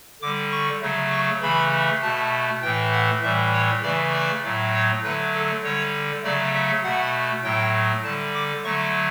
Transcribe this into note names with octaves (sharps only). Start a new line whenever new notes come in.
D3 G3 D6
C#6
C#3 F#3 A3
C#6
C#3 E3 A3 B5
B2 A3 A5
A2 E3 A3 G5
F#5
A2 E3 G3 E5
C#5
C#3 E3 A3 D5
D5
A2 F#3 A3
C#5
D3 F#3 A3 B4
A4
D3 G3 C#5
C#3 F#3 A3 D5
E5
B2 A3 F#5
A2 F#3 A3 G5
D3 G3 A5
D6
D3 F#3 A3 C#6